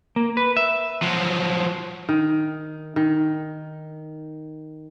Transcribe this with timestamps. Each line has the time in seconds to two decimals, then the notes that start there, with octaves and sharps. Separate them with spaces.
0.16 A#3
0.37 B4
0.57 E5
1.02 F3 F#3
2.09 D#3
2.96 D#3